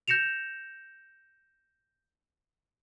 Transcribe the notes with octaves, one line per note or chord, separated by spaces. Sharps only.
G6 A#6 C#7 E7 F7